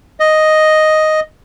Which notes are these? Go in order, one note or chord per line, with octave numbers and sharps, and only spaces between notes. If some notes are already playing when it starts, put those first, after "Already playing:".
D#5